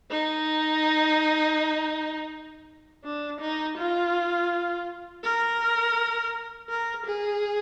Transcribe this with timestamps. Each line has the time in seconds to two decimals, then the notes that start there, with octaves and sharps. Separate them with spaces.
0.11 D#4
3.04 D4
3.40 D#4
3.77 F4
5.24 A#4
6.69 A#4
7.06 G#4